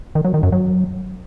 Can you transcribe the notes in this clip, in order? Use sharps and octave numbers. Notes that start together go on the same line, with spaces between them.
D#3
F#3
D#3
F#2
F#3